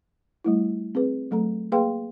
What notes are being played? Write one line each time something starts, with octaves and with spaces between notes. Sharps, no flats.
G3 A3 E4
C4 G#4 B4
F#3 A3 A4 A#5
A#3 G#4 B4 F5 G5 C6